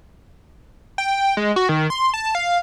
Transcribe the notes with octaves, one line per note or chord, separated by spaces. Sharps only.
G5
G#3
F#4
D#3
C6
A5
F5